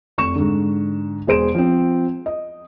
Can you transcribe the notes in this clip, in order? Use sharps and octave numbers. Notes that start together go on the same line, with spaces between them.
F1 C#6 E7
G#2 D3
E1 G#4 C5 D7 E7
F3 C4
D#5